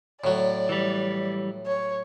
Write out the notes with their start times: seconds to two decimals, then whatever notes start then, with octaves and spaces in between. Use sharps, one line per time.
0.24 A2 F#3 D5
0.69 E3 G3
1.66 C#5